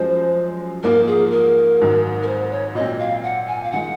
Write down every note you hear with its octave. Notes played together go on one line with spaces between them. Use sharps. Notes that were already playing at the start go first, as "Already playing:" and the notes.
Already playing: F#2 F3 G#3 C5
G#2 F3 A#3 F4 A#4
G#4
A#4
G#1 G#2 F#3
A#4
C5
C#5
A#2 F#3 C4 D#5
F5
F#5
G#5
F5
D#3 G#3 F#5